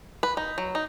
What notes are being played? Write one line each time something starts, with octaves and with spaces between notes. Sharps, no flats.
B4
D#4
F#3
D#4